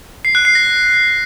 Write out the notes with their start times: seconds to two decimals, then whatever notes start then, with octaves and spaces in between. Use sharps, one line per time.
0.25 C7
0.35 F#6
0.45 C7
0.55 A#6